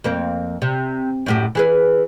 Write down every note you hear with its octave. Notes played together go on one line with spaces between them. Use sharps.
F2 A#3 C4
C3
F#2 A2 G4
E3 G#4 B4